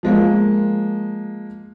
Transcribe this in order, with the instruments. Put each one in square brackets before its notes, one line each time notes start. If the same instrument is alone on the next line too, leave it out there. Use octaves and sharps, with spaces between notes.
[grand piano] F3 G#3 A#3